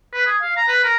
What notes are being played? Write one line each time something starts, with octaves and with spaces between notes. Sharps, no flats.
B4
G#4
F5
A#5
B4
A#4